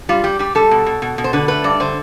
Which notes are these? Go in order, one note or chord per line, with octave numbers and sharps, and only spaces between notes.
G3 F4
G3 G4
G3 G4
G3 A4
B2
B2
B2
B2
C5
D3 B4
A3 B4
G2 D5
D3 C5